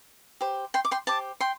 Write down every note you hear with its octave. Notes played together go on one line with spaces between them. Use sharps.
G4 C5
G5 C6
D6
G5 C6
G4 C5 A5 D6
G5 C6